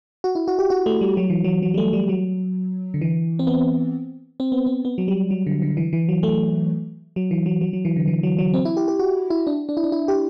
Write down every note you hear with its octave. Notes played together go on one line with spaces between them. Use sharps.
F#4
E4
F#4
G4
F#4
A3
G3
F#3
E3
F#3
F#3
G3
A3
G3
F#3
D3
E3
C4
B3
C4
B3
C4
B3
F#3
G3
F#3
D3
D3
E3
E3
F#3
A3
F#3
E3
F#3
F#3
F#3
E3
D3
E3
F#3
F#3
C4
E4
G4
G4
F#4
E4
D4
D4
E4
D4
E4
G4